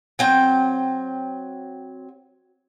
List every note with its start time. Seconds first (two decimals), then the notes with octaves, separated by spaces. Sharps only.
0.19 F#3 C4 G5